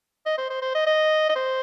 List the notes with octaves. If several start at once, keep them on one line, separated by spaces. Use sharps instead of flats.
D#5
C5
C5
C5
D#5
D#5
D#5
C5